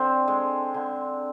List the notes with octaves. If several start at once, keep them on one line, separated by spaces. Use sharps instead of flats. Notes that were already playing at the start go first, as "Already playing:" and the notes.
Already playing: D3 C4
G#3
D3